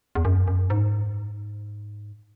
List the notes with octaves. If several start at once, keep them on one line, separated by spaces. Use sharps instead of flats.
E2
F#2
F#2
G#2